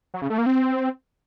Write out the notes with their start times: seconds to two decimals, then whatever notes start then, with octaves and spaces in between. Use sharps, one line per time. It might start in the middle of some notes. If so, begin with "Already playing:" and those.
0.14 F#3
0.22 C#3
0.30 A3
0.38 A#3
0.46 C4